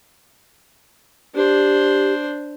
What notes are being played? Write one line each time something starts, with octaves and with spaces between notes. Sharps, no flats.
D4 G4 C5